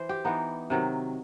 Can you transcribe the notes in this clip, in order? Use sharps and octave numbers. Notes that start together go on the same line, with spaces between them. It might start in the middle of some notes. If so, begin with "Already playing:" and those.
Already playing: E3 C5
G4
E3 B3 D#4
C3 D#3 F#3